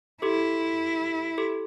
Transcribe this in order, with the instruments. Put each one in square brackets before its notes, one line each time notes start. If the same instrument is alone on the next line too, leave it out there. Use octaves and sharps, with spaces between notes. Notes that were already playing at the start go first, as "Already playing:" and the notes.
[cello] E4 [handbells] G4 A4
[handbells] G4 A4